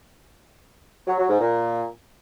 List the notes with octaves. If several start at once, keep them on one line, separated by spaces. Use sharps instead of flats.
F#3
F#3
G#2
A#2